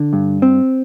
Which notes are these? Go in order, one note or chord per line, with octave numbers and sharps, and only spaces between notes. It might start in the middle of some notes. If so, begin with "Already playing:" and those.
Already playing: D3
G2
C4